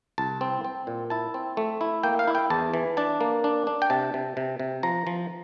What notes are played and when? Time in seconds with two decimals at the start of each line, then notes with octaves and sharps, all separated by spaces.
0.18 C2 A5
0.41 C4
0.64 C4
0.87 A#2
1.10 E4 A5
1.34 C4
1.57 A3
1.81 E4
2.03 A#3 G5
2.19 F5
2.27 E4
2.35 G5
2.50 E2 A5
2.74 E3
2.97 D4 A5
3.21 A#3
3.44 D4
3.67 D4
3.82 G5
3.90 C3 A5
4.14 C3
4.37 C3
4.59 C3
4.83 F3 A#5
5.07 F3